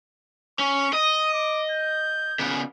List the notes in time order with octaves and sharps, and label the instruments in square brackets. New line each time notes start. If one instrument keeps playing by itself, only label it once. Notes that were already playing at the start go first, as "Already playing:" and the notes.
[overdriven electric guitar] C#4 [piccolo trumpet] C#6
[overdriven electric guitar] D#5 [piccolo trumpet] D#6
[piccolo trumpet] D6
G6
[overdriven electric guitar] C#3 B3